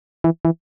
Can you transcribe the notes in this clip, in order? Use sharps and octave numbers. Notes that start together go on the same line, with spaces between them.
E3
E3